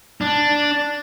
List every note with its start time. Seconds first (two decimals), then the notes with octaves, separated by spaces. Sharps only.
0.21 D4